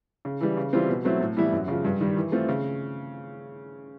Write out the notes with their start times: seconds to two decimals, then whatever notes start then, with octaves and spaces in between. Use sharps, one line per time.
0.25 C#3
0.41 E3 G3
0.57 C#3
0.73 E3 G3 C4 F4
0.89 B2
1.05 F#3 A3 C4 E4
1.21 A2
1.37 E3 G3 B3 E4
1.53 F#2
1.68 C#3 F3
1.84 G2
2.01 D#3 G3
2.17 E3
2.32 A3 C4 F4
2.49 C#3